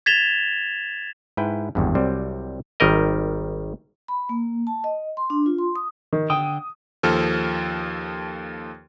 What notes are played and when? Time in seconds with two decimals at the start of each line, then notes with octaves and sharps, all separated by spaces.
0.06 G#6 A6 B6 E7 F7 G7
1.37 G#2 E4 B4 G5
1.75 G#1 E2 G2
1.95 C2 F#3 G3 C4 C5 D5
2.80 G#1 D#3 G3 A#4 D#5
4.08 B5
4.29 A#3
4.67 A5
4.84 D#5
5.17 C6
5.30 D4
5.46 F4
5.58 C6
5.76 D#6
6.13 D#3
6.30 D3 G5 D#6
7.03 D#2 F3 A4 F6